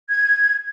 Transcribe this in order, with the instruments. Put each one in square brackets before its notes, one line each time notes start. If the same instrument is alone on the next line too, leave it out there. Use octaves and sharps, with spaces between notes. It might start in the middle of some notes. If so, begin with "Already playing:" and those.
[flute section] G#6